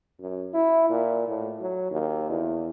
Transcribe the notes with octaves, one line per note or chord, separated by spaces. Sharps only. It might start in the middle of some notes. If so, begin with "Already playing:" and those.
F#2
E4
A#2
A2
F#3
D#2
E2